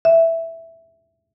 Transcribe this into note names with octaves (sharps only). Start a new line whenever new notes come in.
E5